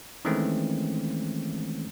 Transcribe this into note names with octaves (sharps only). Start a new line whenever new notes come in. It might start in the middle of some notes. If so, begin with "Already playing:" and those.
D#3 E3 G#3 A3 C4 C#4